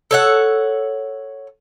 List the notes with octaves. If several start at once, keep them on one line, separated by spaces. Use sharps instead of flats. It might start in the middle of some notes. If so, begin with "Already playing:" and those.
A4 C#5 F#5